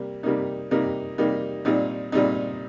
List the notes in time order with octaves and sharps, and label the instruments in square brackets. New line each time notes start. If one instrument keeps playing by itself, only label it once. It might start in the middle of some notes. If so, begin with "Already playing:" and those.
Already playing: [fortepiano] C3 G3 A#3
C3 G3 A#3 D#4
C3 G3 A#3 D#4
C3 G3 A#3 D#4
A#2 G3 C4 D#4
A#2 G3 C4 D#4